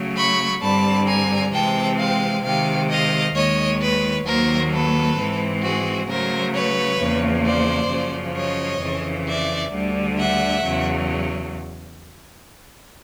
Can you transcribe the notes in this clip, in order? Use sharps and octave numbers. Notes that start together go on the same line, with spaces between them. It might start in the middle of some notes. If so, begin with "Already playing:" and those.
Already playing: C#3 F#3 A3
B5 C#6
G2 D3 G3 C4 A5 B5
G#5 A#5
C3 E3 G#3 C4 G5 A5
F5 G5
C3 D#3 G#3 F5 G5
D#5 F5
D#2 D#3 G#3 C#5 D#5
B4 C#5
D#2 D#3 F#3 A#3 A#4 C5
A4 B4
G#2 E3 G#3 C4
F#4 G#4
C#3 F#3 A3 A#4 C5
B4 C#5
E2 C#3 F3 A#3
C5 D5
F#2 C#3 F3
C#5 D#5
F2 C#3 E3
D5 E5
D2 D3 G3
E5 F#5
E2 C#3 F#3